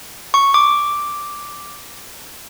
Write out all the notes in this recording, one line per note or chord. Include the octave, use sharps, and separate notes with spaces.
C#6
D6